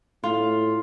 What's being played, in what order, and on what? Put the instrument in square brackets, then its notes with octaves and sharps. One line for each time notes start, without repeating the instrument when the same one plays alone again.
[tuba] A2 [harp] F4